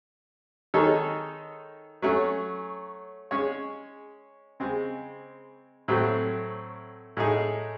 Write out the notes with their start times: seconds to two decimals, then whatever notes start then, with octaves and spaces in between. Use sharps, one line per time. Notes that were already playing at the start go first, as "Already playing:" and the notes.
0.74 D#3 G#3 D#4 A4 C#5
2.02 F#3 A3 C#4
3.31 G#3 C#4 G#4 C#5
4.60 C#3 G#3 C4
5.88 A2 F#3 A3 C4
7.17 A2 G#3 D#4 G#4